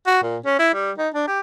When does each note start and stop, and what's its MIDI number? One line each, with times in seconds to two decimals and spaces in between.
0.07 0.19 66
0.22 0.37 46
0.45 0.56 61
0.59 0.71 64
0.74 0.91 55
0.98 1.09 63
1.14 1.26 62
1.28 1.40 67